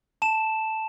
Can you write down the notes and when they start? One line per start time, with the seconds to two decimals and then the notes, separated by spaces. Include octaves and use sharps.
0.22 A5 E7